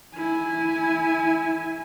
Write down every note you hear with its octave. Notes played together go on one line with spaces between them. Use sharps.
E4 G#5